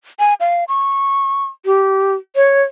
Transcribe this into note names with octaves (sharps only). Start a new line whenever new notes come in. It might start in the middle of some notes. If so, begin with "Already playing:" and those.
G#5
F5
C#6
G4
C#5